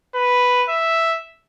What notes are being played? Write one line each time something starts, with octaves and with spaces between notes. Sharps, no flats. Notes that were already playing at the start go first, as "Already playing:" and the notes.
B4
E5